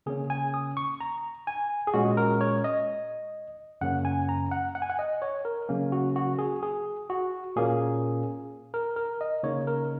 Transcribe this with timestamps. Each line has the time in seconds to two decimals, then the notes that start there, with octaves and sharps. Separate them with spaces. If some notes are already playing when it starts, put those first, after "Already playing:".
0.06 C#3 A#3 C#4 G#4
0.30 G#5
0.54 D#6
0.77 C#6
1.00 A#5
1.47 G#5
1.87 G#4
1.94 A#2 G#3 C#4 F#4
2.17 A#4
2.41 C#5
2.64 D#5
3.81 F#2 C#3 A#3 C#4 F#5
4.05 G#5
4.29 A#5
4.52 F#5
4.75 F#5
4.82 G#5
4.90 F#5
4.99 D#5
5.22 C#5
5.45 A#4
5.69 C#3 F#3 A#3 C#4
5.92 F#4
6.16 F#4
6.39 G#4
6.63 G#4
7.10 F#4
7.56 A#2 A#3 C#4 G#4
8.74 A#4
8.96 A#4
9.21 D#5
9.43 C#3 A#3 D#4 C#5
9.67 A#4